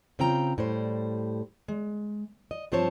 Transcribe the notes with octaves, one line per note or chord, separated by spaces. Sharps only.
C#3 C4 F4 G5 A#5
A2 G3 C5
G#3
D#5
G2 F3 C4 C5 C#5 A5